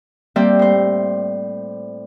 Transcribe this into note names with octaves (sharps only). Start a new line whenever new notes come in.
G3 A#3 C4 D5 E5 G6
A2 C5